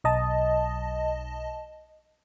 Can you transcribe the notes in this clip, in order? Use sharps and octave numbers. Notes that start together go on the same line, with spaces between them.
B1 D#5 A5